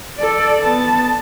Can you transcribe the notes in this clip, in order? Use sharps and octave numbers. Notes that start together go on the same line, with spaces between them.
A4 D5
B3 A5